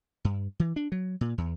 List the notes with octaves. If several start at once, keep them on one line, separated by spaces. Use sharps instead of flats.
G2
E3
D4
F#3
A#2
E2